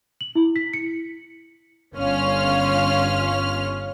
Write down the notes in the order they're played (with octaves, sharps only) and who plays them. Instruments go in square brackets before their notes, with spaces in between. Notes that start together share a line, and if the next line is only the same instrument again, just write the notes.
[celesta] F#7
E4
B6
C#7
[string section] G1 C#4 F4 F6